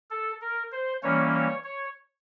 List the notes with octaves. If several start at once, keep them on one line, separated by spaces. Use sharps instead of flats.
A4
A#4
C5
E3 G3 A#3 C#4 C#5
C#5
C#5